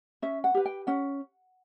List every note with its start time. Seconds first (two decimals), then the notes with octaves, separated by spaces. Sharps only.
0.22 C#4 E5
0.44 F#5
0.54 G4 B4
0.66 G5
0.87 C#4 F#5